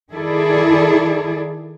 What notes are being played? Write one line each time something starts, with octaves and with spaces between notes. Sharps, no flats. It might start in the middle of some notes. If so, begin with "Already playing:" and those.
D#3 E4 G#4 A4 D5